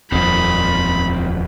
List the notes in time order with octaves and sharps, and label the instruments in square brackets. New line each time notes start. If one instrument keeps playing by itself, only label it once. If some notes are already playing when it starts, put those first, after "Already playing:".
[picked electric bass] D#1 F2 [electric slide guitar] C4 A#4 C5 [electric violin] B5